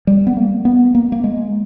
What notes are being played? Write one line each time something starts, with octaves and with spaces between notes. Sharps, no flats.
G3
B3
A#3
B3
A#3
A#3
G#3